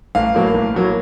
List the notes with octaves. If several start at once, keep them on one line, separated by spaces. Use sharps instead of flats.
A1 F5
A2 F#3 A#3
A1
A2 F#3 A#3